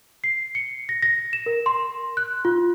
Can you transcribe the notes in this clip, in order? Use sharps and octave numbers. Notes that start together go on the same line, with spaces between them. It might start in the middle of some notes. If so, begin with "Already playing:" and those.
C7
C#7
A#6
A#6
E7
A#4
C6
F#6
F4